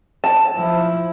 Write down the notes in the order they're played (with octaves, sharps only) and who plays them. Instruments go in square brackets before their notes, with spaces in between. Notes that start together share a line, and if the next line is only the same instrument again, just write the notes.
[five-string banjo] A5
[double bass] F3 E4